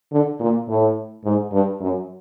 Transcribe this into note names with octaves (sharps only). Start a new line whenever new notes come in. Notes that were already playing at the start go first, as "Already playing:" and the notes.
D3
A#2
A2
G#2
G2
F#2